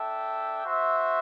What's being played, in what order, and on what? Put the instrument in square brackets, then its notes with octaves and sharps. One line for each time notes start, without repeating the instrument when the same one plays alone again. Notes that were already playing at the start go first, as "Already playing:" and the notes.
Already playing: [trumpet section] D4 A4 E5 G5
F#4 C5 E5